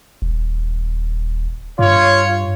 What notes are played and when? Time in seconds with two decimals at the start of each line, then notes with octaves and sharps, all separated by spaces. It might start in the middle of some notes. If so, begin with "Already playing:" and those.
0.22 D#1
1.79 G2 F4 C#5